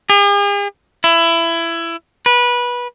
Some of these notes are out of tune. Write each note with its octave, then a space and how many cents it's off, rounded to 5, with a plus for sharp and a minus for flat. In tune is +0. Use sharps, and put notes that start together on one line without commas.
G#4 -45
E4 +20
B4 -20